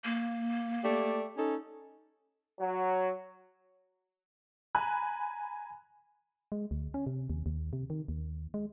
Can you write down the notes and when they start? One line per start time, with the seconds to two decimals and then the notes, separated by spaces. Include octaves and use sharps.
0.05 A#3
0.84 A3 G4 D5
1.37 C#4 D#4 A4
2.60 F#3
4.75 G#5 A#5 B5 F#6
6.52 G#3
6.71 D2
6.94 C#4
7.07 C3
7.30 D#2
7.46 D#2
7.73 C3
7.90 D#3
8.08 D#2
8.54 G#3